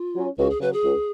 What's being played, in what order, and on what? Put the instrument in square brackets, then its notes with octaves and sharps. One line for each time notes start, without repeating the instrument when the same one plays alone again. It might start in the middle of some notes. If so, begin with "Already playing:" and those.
Already playing: [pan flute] F4
[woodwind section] F#3 C#4
[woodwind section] C#2 [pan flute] F#4
[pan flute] G#4
[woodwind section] C#3 F#3 [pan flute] B4
[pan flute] G#4
[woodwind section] C#2